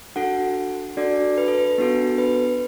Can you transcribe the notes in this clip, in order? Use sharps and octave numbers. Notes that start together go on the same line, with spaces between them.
D4 F#4 A4 F#5
D4 F#4 A4 D5
B4
A4
B4
B3 D4 F#4 A4
B4